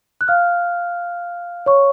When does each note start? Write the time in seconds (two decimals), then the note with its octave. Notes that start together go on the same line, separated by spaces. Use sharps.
0.21 F#6
0.28 F5 F6
1.66 C#5 C#6